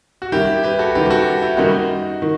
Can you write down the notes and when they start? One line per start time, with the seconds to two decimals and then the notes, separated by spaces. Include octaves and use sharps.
0.22 F#4
0.32 F#2 D#3 G3 E4 G4
0.63 G4 B4
0.79 F#4 A4
0.95 F#2 D#3 G3 G4 B4
1.06 G4
1.10 F#4 A4
1.42 E4 G4
1.57 F#2 D#3 G3 D#4 F#4
2.22 D#3